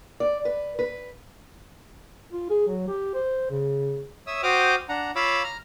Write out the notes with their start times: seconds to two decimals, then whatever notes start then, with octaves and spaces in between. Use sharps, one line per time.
0.20 D5
0.45 B4
0.79 B4
2.33 F4
2.50 G#4
2.68 F#3
2.88 G4
3.14 C5
3.51 C#3
4.27 C#5 E5 D#6 E6
4.43 F#4 C5 G5 D6 D#6 F6
4.89 D4 F#5 A#5
5.16 F4 C#5 F5 B5 D6 E6
5.43 A#5 F6